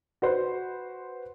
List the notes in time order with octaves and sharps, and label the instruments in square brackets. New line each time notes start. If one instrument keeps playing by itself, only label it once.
[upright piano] F#4 B4 C5